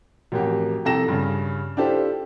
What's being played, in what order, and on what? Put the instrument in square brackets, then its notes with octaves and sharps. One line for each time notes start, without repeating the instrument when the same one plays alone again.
[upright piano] A1 F2 A#3 F#4 G4
C2 F2 A4 G5 A#6 E7
G2 C#3
D4 E4 F4 G4 A4 C5